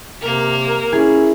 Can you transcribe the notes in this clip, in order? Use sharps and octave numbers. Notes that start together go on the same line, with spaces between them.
C3 A#3 A#4
C#4 E4 G#4